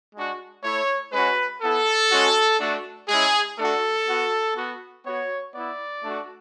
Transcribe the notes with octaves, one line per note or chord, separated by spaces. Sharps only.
G#3 D4 F#4
A3 E4 C#5
G#3 C#4 F#4 B4
B3 E4 A4
G#3 C#4 F#4
A3 D4 F#4
G#3 C#4 E4 G#4
A3 D4 F#4 A4
B3 F#4
B3 F#4
B3 F#4 C#5
B3 E4 D5
A3 D4 F#4